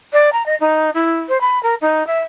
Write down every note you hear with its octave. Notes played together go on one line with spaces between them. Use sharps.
D5
A#5
D#5
D#4
E4
C5
B5
A#4
D#4
E5